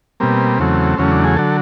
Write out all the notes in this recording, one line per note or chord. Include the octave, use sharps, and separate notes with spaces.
B2 G3 A#3 C4
E2 C#3 F#3 A3
E2 C#3 F#3 A3 C#4
D4
G#4
D3 F#3 A4